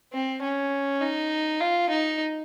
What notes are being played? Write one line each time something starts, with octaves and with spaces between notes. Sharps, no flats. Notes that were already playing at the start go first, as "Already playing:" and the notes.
C4
C#4
D#4
F4
D#4